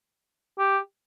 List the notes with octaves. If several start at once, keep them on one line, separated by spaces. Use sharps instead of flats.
G4